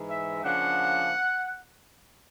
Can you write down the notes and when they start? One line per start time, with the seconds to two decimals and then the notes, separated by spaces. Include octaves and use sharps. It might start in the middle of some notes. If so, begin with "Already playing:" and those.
Already playing: G#2 E3 G#3
0.09 E5
0.43 C#3 F3 A#3 D4 F#5